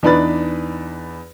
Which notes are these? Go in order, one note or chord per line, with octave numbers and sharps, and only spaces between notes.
E2 D4 D#4 B4 B5 A6